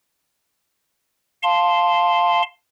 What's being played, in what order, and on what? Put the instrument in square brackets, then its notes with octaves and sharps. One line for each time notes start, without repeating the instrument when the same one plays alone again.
[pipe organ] F5 A5 C6